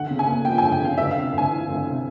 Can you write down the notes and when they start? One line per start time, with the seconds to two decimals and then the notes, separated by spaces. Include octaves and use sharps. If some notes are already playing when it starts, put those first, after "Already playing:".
Already playing: D2 F#5
0.10 C#3
0.19 G#5
0.27 A#3
0.45 F3 G5
0.58 D2 G#5
0.72 G5
0.81 C#3 F5
0.98 D2 E5
1.11 F5
1.16 C3
1.33 D2 G#5
1.51 E3
1.69 D2
1.87 C3